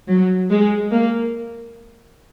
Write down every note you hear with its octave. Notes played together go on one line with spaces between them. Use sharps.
F#3
G#3
A#3